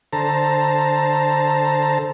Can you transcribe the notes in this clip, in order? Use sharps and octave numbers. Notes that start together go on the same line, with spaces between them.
D3 A4 C5 A5 A#5